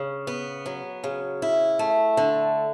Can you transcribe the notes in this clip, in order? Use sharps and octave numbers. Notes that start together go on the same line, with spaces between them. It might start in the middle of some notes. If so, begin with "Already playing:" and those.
Already playing: C#3
B3
F#3
C#3
E4
A3
D3